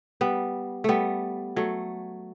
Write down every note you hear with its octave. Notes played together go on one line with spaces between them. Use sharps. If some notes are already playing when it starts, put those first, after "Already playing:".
G3 B3
G3 A3 B3
F#3 A3